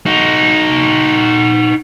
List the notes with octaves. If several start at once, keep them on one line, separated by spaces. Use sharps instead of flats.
D#4 F#4